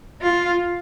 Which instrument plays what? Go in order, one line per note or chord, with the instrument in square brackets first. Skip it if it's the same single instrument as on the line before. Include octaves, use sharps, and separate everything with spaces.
[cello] F4